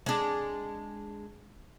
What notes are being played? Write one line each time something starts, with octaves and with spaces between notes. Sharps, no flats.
G#3 D4